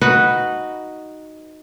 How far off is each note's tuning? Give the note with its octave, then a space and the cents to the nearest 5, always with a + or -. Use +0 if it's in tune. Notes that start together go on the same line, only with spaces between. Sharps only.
D#4 +0 F#4 +0 B4 +0